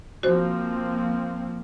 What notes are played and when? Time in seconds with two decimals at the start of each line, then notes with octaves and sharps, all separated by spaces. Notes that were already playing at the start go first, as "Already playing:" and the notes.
0.23 F3 A#3 C4 F#4 C5